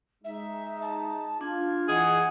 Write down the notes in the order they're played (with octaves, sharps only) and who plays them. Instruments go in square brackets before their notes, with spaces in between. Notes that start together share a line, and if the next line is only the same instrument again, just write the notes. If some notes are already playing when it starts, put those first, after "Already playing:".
[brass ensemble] G#3 D#4 [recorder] E5
[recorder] A5
[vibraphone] D4 [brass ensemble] F4 [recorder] G#6
[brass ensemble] E3 F#5 [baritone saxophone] G#4 [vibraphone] D#5